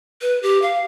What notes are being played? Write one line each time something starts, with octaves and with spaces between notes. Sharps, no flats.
B4
G4
F5